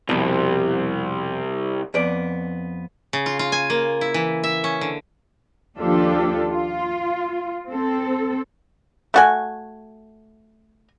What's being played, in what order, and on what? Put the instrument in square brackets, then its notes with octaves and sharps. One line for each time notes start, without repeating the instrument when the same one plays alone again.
[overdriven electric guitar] C2 [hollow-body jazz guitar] F2 B2
[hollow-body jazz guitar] F2 B3 D5
[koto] C#3
F4
F4
G#5
A#3
E4
E3
E5
C#4
D3
[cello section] D#2 F3 D4 F4 G4 A4
F4
C4 A4
[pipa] A3 F#4 G#5